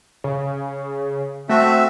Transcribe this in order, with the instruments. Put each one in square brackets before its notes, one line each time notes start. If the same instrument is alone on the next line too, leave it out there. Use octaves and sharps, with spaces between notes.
[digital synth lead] C#3
[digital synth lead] A3 [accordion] C4 F#4 E5